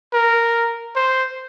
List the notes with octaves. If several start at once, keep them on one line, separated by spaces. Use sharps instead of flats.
A#4
C5